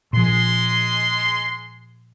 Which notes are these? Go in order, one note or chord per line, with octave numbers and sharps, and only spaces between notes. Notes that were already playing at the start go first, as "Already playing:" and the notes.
A#2 F3 G#3 C6